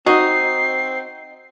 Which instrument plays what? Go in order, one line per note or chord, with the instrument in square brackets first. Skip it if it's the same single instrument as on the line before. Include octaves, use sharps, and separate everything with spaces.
[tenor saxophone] C4 [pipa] D#4 [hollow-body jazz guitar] F#4 [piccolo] C7